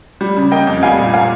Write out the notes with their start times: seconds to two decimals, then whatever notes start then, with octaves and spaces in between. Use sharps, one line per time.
0.21 G3
0.36 C#3
0.52 A#3 D#5 G5
0.67 F2
0.83 G3 F5 G#5
0.98 A#2
1.14 A#3 F5 G#5